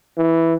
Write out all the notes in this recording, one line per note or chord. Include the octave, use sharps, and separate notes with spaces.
E3